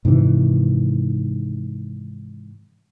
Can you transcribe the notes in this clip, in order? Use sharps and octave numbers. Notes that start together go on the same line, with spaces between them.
G#2 C3 D#3 E3